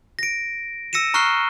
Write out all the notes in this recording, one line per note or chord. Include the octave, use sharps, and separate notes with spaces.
A#6 D7
E6 A#6 C#7 D#7 E7
A#5 C#6 F6 F#6 C7 G7